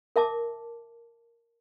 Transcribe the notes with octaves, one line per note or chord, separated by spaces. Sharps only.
A#4 E5 A5 D6